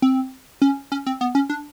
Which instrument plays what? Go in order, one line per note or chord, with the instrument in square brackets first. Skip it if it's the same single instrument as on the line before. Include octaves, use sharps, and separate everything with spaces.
[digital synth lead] C4
C#4
C#4
C4
B3
C#4
D4